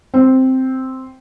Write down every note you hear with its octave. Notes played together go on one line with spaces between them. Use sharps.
C4